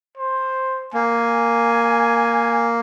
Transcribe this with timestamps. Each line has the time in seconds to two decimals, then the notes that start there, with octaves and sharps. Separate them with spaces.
0.17 C5
0.94 A#3 G#5